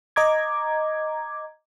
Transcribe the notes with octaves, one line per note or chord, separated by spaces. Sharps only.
D#5 A#5 D6 G#6